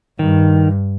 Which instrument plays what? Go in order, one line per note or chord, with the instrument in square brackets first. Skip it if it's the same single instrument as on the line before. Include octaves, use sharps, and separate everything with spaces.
[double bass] G2 [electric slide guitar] D#3